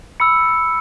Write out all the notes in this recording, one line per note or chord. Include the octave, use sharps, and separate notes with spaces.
B5 E6 C#7